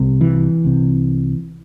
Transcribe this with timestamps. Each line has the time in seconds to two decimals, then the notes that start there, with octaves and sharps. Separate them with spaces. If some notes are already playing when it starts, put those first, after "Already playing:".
Already playing: C2 C3
0.21 E3
0.64 C2 C3